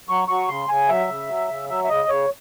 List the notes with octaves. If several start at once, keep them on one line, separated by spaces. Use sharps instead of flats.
F#3 C#6
F#3 C#6
C#3 C6
C#3 G#5
F#3 E5
C#3
F#3
C#3
F#3 E5
E5
C#3 D#5
C#3 C#5